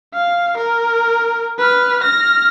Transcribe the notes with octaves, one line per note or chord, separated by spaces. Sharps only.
F5
A#4
B4 F6
F6 A#6